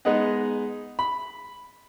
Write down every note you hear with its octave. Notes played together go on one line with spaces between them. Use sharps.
G#3 B3 D#4 G#4 D#5 F#5
B5